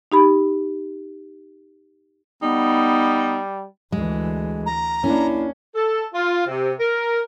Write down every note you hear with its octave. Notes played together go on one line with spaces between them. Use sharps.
D#4 G4 B5
G3 B3 D#4
D2 E3 G#3
A#5
A#3 C#4 D4 E4
A4
F4
C3
A#4